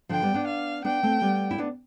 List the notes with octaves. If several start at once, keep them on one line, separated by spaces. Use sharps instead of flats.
D3 F3 G5
G3 B3
B3 D4
F5
B3 D4 G5
A3 C4
G3 B3
E4
B3 D4